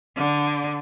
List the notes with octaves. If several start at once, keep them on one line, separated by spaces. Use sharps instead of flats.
D3